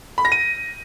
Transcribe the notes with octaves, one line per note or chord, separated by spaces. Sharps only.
B5
A#6
D#7